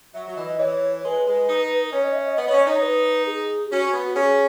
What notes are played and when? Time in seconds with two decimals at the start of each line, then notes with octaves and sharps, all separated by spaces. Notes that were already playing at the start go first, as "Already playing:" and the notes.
0.14 F#3 E5
0.28 F#3
0.37 E3 D#5
0.59 E3 C#5
1.04 G#3 B4
1.27 G#3
1.48 D#4
1.93 C#4 C#5
2.04 D#5
2.15 E5
2.26 D#5
2.37 B3 D#5
2.47 B3 C#4 C#5
2.60 D#5
2.66 D#4 C#5
2.82 B4
3.26 G#4
3.71 C#4 F#4
3.93 B3
4.15 C#4 G#4